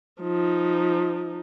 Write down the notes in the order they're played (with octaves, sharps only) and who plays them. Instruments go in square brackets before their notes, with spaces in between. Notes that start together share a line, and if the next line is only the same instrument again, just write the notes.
[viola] F3 D#4